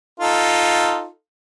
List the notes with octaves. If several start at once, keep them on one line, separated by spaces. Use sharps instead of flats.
D#4 F4 A4